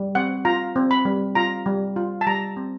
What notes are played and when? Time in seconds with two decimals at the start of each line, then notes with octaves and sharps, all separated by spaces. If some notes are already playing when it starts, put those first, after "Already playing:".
Already playing: G3
0.15 C4 F#5
0.45 F4 A#5
0.76 C4
0.91 B5
1.05 G3
1.35 F4 A#5
1.66 G3
1.96 F4
2.21 A5
2.27 G3 A#5
2.57 C4